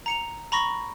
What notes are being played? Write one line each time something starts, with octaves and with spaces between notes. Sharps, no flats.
A#5 C#7 F7
A#5 B5 C#6 A#6